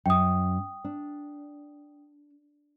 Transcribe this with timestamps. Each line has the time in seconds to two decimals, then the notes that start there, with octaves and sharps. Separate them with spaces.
0.06 F#2 G5 D#6
0.84 D4